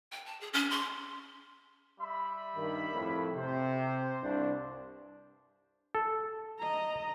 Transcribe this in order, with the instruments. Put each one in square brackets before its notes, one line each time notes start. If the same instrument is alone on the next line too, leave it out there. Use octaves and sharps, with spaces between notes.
[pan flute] G5
A5
G#4
C#4
C6
[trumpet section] G3 E5 B5
[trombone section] G2 D#3
F2 A2
[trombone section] C3 [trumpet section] C5
[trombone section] C2 G2 D4
[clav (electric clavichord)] A4
[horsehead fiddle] D#5 A#5